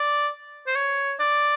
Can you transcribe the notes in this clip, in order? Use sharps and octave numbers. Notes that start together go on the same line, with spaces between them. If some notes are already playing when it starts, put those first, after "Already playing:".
Already playing: D5
C5
C#5
D5